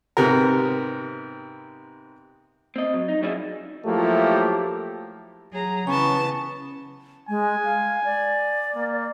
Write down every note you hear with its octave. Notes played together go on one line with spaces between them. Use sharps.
G#2 C3 B3 G4 A#4
C4 D#5
F#3
D#4
F#3 G3 C#4 E4 G#4
F3 F#3 A3 A#3 E4 G4
F#3 G#4 A#5
C#3 E3 B3 C#4 A5 C#6
G#3 G#5
F5
D5
A#3